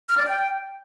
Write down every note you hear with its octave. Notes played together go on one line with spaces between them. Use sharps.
F6
D5
G5